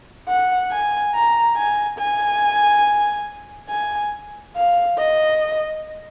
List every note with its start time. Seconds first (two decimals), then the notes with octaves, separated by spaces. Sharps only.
0.28 F#5
0.71 G#5
1.14 A#5
1.57 G#5
1.99 G#5
3.69 G#5
4.56 F5
4.98 D#5